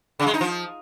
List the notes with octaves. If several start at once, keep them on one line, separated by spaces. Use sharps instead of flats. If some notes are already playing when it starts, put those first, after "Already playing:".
C#3
G#3
D#4
F3